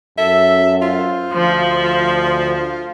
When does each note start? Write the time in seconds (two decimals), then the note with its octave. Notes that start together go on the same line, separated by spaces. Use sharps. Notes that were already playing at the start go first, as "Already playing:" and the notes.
0.18 F#2 A4 E5
0.82 F4 C5
1.33 D2 F3